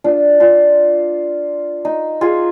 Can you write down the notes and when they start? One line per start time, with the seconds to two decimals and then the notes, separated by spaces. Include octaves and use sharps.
0.04 D4 F4
0.40 D4 F4
1.85 D#4
2.21 F4 G#4